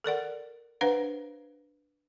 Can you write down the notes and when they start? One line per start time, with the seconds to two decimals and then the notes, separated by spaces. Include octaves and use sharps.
0.04 A4 A#4 D5 F#5
0.81 D4 B4 C5 F5 F#5